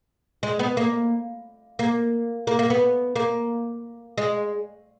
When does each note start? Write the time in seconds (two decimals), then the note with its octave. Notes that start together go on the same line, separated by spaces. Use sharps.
0.43 G#3
0.59 B3
0.77 A#3
1.79 A#3
2.47 A#3
2.59 A#3
2.70 B3
3.16 A#3
4.18 G#3